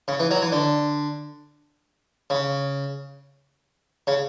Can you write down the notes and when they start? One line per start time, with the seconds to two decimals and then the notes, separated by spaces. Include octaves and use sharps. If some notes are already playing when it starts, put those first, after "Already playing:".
0.08 C#3
0.20 E3
0.31 F#3
0.42 E3
0.52 D3
2.30 C#3
4.07 C#3